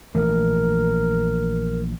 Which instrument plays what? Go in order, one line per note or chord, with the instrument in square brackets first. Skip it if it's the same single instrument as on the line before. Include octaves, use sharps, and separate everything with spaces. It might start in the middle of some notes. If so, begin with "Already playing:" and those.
[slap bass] A#1 E3 A3 [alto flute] A#4